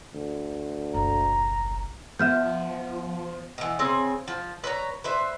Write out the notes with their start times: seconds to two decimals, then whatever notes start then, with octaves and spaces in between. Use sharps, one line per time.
0.15 D2
0.94 F#1 B1 A#5
2.19 F3 B3 E5 F6 G6
3.58 B2 E3
3.79 C#3 C4 G#5
4.28 F3
4.64 B4 C#5 A#5
5.04 B4 C5 E5